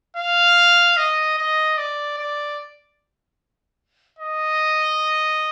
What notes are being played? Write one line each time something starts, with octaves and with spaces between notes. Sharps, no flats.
F5
D#5
D#5
D5
D5
D#5